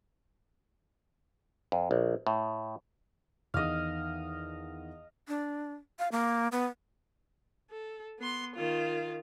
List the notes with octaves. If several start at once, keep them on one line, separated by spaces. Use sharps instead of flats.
F2
A#1
A2
E2 D#3 D#5 F5
D4
F5
A#3
B3
A4
B3 C6
D#3 F4